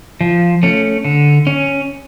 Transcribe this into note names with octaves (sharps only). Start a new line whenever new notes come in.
F3
A3 C#4
D3
C#4